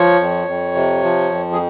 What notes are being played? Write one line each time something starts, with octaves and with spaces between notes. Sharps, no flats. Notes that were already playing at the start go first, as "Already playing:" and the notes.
Already playing: F3 C#5
F2
F2
C3
F3
F2
G#4